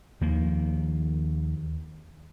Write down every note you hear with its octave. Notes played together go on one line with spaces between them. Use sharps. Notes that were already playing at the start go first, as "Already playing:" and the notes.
D#2 D#3 F3 A#3